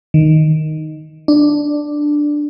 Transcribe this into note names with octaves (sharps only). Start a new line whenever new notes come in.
D#3
D4